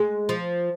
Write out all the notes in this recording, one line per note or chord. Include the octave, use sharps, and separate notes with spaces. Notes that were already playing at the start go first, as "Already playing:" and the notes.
Already playing: G#3
F3